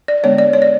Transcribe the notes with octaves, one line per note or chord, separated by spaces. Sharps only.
D5
D3 G#3 B3 D4 C#5
D5
C#5
D5